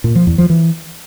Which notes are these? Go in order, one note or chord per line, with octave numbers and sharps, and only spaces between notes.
A#2
F3
E2
F3
E3